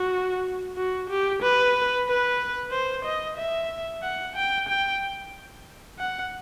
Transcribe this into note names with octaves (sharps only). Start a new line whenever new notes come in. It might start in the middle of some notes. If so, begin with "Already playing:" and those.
Already playing: F#4
F#4
G4
B4
B4
C5
D#5
E5
F#5
G5
G5
F#5